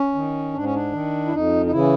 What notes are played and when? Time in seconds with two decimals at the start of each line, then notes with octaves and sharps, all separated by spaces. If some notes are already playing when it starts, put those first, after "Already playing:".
Already playing: C#4
0.15 D#3
0.54 G#2 D4
0.64 C#4
0.74 D4
0.93 D#3
1.26 E4
1.32 F2 D#4
1.66 D#4
1.72 C#3 E3 E4